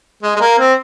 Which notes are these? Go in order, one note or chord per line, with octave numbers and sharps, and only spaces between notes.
G#3
G#3
A#3
C4